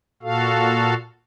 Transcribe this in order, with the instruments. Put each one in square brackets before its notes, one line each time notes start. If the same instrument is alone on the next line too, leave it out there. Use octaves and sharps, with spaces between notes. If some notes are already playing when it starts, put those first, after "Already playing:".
[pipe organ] A#2 F#4 A4 F5